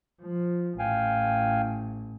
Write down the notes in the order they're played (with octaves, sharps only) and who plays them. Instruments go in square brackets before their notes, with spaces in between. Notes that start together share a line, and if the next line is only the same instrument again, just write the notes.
[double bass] F3
[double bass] A1 [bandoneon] F5 G5 G#5